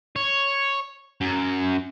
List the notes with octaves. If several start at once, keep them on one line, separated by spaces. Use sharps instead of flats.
C#5
F#2